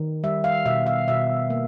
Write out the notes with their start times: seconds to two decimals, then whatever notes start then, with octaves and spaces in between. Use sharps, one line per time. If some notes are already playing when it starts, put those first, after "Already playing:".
Already playing: D#3
0.24 G3 E5
0.44 F5
0.66 B2 E5
0.86 F5
1.08 B2 E5
1.50 A#3